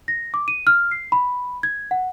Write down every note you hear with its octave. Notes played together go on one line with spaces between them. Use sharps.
A#6
D6
D#7
F6
C7
B5
G#6
F#5